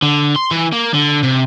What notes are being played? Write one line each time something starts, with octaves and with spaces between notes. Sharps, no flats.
D3
C6
E3
A#3
D3
C3